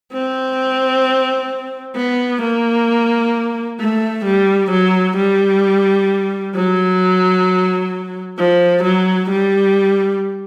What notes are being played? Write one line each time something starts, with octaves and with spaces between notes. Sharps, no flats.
C4
B3
A#3
A3
G3
F#3
G3
F#3
F3
F#3
G3